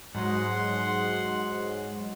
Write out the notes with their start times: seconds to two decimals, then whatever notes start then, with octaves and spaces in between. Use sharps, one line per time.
0.15 G#2 F#3 G#3 F#5 C6